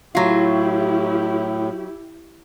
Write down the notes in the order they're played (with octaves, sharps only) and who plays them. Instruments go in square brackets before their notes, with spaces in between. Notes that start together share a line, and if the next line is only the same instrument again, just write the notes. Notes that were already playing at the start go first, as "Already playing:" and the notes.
[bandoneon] A2 [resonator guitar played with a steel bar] F#3 F4 [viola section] E4 G4